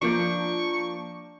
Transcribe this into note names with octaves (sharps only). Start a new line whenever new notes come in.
F3 A#3 D4 C#6 G6